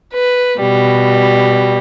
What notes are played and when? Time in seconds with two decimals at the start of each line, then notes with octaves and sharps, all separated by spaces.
0.14 B4
0.60 B2 G3